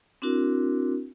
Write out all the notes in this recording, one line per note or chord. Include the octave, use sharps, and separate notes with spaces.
C4 D4 E4 F#4 A#4